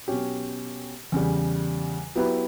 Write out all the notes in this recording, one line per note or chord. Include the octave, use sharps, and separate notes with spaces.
B2 F#3 C#4 G4
E2 C#3 G3
F#3 B3 E4 G4 B4